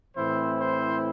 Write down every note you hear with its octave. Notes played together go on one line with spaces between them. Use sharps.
A2 E3 C4 E4 C5
C5